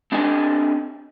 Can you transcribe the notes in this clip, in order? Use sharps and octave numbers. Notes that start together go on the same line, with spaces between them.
C4 D4 G4 A4 D#5 G#5